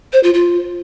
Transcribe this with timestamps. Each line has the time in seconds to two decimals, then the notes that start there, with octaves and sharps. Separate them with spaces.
0.13 C5
0.23 F4
0.34 F4